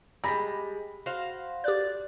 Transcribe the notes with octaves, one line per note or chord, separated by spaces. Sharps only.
G3 G#3 B5 A#6
F#4 C5 F5
G4 D5 F#6